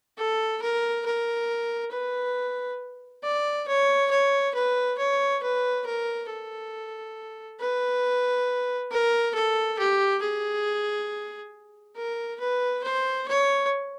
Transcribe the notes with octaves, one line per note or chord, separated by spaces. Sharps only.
A4
A#4
A#4
B4
D5
C#5
C#5
B4
C#5
B4
A#4
A4
B4
A#4
A4
G4
G#4
A#4
B4
C5
C#5